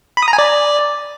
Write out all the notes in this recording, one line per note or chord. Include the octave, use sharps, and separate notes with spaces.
B5
D#6
A#5
G#5
D5